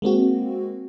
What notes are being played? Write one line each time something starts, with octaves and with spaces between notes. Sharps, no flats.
G#3 A#3 C4 F#4